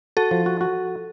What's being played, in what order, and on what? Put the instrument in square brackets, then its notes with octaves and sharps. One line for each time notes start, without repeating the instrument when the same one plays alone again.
[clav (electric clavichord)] F#4 [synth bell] A4
[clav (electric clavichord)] F3
F#4
F#4